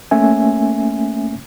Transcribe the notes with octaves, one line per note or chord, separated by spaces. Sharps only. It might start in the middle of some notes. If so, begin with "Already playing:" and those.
A3 A#3 C#4 E5 G#5